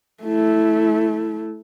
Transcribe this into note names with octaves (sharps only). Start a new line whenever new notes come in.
A3 E4